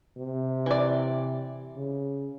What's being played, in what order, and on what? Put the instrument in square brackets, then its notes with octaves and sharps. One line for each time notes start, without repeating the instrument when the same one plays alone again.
[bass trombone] C3
[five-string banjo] E3 D5
[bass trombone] C#3